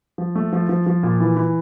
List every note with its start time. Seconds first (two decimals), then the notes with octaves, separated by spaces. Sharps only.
0.18 F3
0.35 A3
0.53 F3
0.69 F3
0.86 F3
1.03 A#2
1.20 E3
1.36 E3